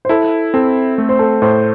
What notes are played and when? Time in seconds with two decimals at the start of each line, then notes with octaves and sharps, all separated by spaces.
0.05 C5
0.09 E4 A4
0.54 C4 A4
0.98 A3 A4
1.09 C5
1.19 A4
1.42 A2 C5